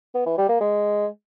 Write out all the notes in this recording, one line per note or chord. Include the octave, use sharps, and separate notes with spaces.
B3
E3
G3
A#3
G#3